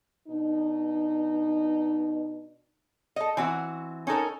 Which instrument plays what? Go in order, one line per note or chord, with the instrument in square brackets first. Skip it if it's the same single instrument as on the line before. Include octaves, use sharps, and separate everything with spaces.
[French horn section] B2 D4 D#4
[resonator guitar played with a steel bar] A4 D#5
E3 C4 F#4
C#4 D#4 A4 A#4